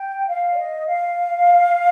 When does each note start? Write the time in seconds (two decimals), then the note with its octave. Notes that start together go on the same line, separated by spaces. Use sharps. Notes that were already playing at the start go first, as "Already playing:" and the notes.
Already playing: G5
0.28 F5
0.52 D5
0.57 D#5
0.87 F5